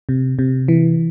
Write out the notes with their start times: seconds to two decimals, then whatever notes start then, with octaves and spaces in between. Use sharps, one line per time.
0.09 C3
0.39 C3
0.68 E3